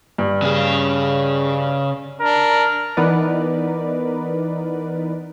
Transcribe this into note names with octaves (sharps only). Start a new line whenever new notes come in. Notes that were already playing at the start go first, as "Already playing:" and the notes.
G2
C#3 G#4
D4 A#4
E3 B3 D#4 A#4 B4 D5